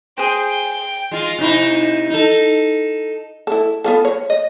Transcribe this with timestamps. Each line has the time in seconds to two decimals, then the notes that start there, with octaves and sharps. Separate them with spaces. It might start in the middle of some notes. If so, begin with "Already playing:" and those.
0.18 G#4 C5 G5
1.11 G#3 F4
1.39 C3 D#4 E4
2.10 D#4 A4
3.47 E4 A4
3.84 B3 F4 A4
4.05 C#5
4.30 D#5